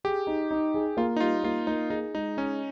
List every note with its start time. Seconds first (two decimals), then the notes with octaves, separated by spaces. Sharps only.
0.04 G4 G#4
0.27 D#4
0.51 D#4
0.74 G#4
0.97 A#3 F4
1.16 D#4
1.20 G3 F4
1.44 A#3 F4
1.67 A#3 D#4
1.90 D#4 G#4
2.15 G#3 D#4
2.37 C#4 D#4